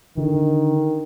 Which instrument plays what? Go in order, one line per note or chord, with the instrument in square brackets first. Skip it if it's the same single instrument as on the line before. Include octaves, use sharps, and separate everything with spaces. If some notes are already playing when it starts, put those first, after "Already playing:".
[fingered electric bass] D3 [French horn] D#3